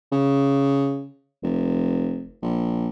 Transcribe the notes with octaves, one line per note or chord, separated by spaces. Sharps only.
C#3
F1
A#1